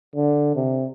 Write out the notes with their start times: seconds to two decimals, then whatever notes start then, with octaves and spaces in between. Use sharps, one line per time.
0.16 D3
0.56 C3